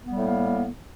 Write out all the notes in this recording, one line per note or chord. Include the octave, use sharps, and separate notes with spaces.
A2 G3 A#3 B3